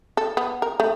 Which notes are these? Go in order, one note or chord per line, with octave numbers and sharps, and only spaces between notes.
A4
B3
A#4
A3